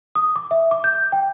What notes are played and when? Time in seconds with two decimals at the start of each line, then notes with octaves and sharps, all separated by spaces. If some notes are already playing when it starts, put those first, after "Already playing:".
0.15 D#6
0.36 D6
0.51 E5
0.71 D6
0.84 G6
1.12 G5